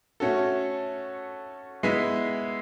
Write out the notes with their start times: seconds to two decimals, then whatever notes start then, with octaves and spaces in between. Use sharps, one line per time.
0.20 A3 C#4 F#4 A4
1.83 G#3 B3 E4